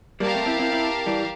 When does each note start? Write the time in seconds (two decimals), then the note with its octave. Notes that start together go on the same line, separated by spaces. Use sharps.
0.20 G3 A#3 G4 A#4 F5 A5
0.34 A3 C4
0.46 C4 E4
0.59 C4 E4
0.72 C4 E4
1.06 E3 G3